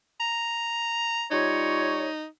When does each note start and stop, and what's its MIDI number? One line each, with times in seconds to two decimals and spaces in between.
0.20 1.26 82
1.31 2.07 55
1.31 2.26 63
1.31 2.07 65
1.31 2.07 73